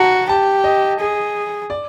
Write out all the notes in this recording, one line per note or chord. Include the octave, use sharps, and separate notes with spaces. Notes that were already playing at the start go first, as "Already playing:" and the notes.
Already playing: F#4 F#5 A5 A#5
G4 A5
D#5
G#4
D5